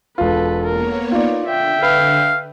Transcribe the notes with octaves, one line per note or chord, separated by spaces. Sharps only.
E1 F4 A4 B4
A#3 B3 A#4 C#5
D#4 F4 D5
D3 E5 G5
B4 F5